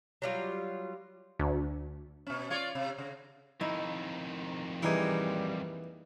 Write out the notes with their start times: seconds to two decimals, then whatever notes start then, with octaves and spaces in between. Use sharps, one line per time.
0.22 F#3 G3 F4
1.40 D2
2.27 B2 C#4
2.50 F4 C#5 D5
2.75 C3
2.98 C#3
3.61 F2 D#3 D#4 E4
4.82 E3 G3 A#3 D#4 G#4